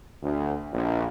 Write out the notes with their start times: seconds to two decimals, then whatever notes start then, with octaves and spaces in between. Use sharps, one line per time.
0.22 D2
0.74 A#1